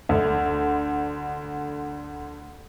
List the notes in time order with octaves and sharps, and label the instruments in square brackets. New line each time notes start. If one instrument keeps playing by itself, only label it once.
[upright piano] D2 D3